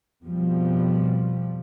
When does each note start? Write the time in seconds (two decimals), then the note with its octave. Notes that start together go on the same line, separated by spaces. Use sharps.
0.23 F2 B2 F3 G3